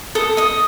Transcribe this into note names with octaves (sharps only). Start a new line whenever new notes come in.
A4 D#6
D#5 D#6